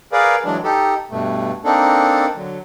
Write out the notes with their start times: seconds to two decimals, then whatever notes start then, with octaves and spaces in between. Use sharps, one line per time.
0.12 G#4 A#4 B4 D5 F5
0.45 E3 F#3 G#3 D4
0.64 D#4 G4 A4
1.11 G2 B2 A3
1.65 A#3 C4 D4 D#4 A4
2.35 D3 F#3